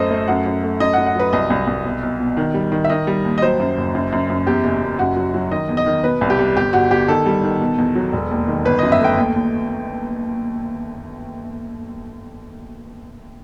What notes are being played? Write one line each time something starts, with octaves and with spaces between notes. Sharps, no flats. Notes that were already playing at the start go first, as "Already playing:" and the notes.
Already playing: F#2 A3 C5 D#5
A3
F#2 F#5
F#2
A3
F#2 D#5
F#5
F#2
F#5
F#3 B4
C2 D#5
C2
C2
B1
B1
B2
D#3
G3
D#3
E5
D#3 D#5
G3
D#2
D#5
F#3 C5
F#2
F#1
F#2
F#2
F#2
E2 G4
F#1
F#1
F#2 F#4
F#3
F#3
D#3 D#5
E2
D#5
D#3
B2 B4
C2
G4
G3
G1 G4
G1 F#4
G1 G4
D#3 A4
G3
D#3
B2
E2
F#3
E1
D#2
D#3
G1 B4
F#2 D#5
E5
A3 G5
D#2
D#2